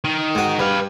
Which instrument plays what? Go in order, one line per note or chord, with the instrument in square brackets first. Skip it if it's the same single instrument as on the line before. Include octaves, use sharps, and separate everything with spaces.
[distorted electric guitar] D#3
[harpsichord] G#2 F#4
[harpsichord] G2 [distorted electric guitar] B4 F5